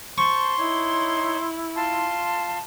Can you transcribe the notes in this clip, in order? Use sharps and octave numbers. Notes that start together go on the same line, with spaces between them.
C5 A5 C6 C#6
D#4 E4 C#5
F4 A5 C6